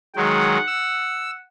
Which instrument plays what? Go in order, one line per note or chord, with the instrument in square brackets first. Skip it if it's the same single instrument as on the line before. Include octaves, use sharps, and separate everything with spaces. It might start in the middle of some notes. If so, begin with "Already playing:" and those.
[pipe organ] D#3 F#3 G#3 [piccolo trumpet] F#5
[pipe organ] E6